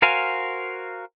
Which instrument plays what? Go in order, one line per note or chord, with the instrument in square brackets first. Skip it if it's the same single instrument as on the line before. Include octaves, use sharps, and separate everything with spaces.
[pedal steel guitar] F#4 A#4 C5 F5 G#5